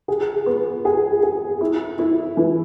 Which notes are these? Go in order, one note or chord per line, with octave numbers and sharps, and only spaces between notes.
G#4
B3
G#4
G#4
E4
E4
E3